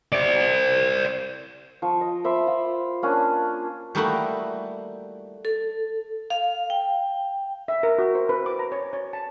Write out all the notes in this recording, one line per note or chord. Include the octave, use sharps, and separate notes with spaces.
C5 D5
F3 C#6
D#5
C5 E5 B5 D6
F4
A#3 C#4 D4 A5
G3 A3 A#3 D#4 E4 F#4
A4
F5
G5
E5
A#4
F#4
C5
B4
D6
A#5
C#5
C#5
A5